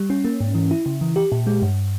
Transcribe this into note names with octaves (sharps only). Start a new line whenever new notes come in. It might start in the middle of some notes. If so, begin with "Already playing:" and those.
Already playing: G3
C#4
A#3
G#2
E3
E4
C#3
E3
G4
A#2
G#3
G2